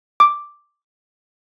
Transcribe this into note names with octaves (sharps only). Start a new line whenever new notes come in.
D6